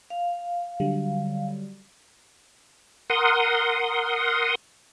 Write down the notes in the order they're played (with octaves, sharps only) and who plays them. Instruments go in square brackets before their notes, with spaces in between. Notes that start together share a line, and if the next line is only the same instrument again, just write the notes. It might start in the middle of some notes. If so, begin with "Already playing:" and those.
[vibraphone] F5
[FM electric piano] D3 F#3 G3
[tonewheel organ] A#4 F#5 C6 D#6